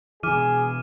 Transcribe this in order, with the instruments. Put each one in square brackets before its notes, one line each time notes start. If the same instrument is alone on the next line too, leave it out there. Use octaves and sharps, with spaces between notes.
[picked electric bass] B2 E3 [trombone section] G#4 [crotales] D6 F6 D#7